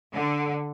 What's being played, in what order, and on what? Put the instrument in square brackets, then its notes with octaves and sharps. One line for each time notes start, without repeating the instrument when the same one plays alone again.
[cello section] D3